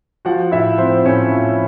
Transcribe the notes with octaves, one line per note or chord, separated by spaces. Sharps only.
F3 F#4 F#5
A2 E4 E5
F3 C4 C5
A2 C#4 C#5
F3